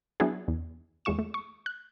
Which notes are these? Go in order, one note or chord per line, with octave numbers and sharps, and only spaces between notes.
F#3 B3 D4 E4 F#4 G#4
E2
E2 G#3 F4 C#6 E7
A3
C#6
F#6